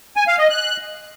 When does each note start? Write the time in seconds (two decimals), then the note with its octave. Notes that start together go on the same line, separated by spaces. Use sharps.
0.16 G#5
0.28 F5
0.39 D#5
0.50 F#6